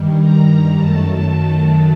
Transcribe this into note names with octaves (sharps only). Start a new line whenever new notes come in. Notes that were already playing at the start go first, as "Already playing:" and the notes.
Already playing: G2 D#3 G3
A#5
F#2 D#3 F#3 A3 A5